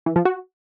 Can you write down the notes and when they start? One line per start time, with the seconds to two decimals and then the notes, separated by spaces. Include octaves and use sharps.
0.06 E3
0.16 F3
0.25 F#4